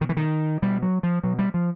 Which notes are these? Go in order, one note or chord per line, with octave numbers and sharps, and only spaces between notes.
B2 D#3
E3
D#3
B2 G3
F#3
F3
B2 F#3
G3
F3